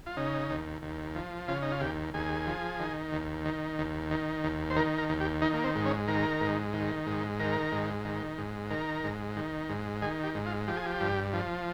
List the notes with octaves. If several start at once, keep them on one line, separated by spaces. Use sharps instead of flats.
F4
C#3 D#4
D#2
D#2
F3
C#3 F4
D#4
F4
D#2 G4
D#2 G#4
F3
D#3
D#2
D#3
D#2
D#3
D#2
C5
D#3 A#4
A#4
D#2
G4
D#3 D#4
A#3
C4
G#2
C#4
D#3 A#4
G#2
D#3
G#2
D#3 A#4
G#2
D#3
G#2
D#3 A#4
G#2
D#3
G#2
D#3 G#4
G4
G#2
F4
F3 G4
G#4
G4
G2
F3